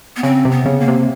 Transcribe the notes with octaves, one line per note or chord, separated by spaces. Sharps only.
B3
C#3 C4
C3
B3
C#3
A#3
C3